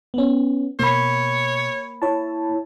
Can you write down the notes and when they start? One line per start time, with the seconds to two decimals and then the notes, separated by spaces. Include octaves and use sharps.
0.14 B3 C#4
0.79 B2 A#3 C#5 B5
2.02 E4 C#5 A5